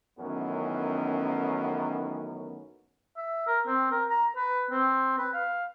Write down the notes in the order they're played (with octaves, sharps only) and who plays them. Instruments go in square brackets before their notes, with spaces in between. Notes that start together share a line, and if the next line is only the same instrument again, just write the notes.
[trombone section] F#2 D#3 E3 A3 B3 C#4
[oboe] E5
A#4
C4
A#4
A#5
B4
C4
B4
F5